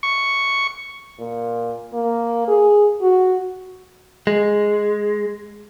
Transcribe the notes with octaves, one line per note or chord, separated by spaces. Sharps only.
C#6
A#2
A#3
G#4
F#4
G#3